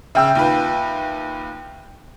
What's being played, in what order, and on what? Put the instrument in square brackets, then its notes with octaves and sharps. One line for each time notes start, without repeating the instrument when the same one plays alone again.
[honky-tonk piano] C#3 [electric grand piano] E5 G5 E6
[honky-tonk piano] D#2 F4 B4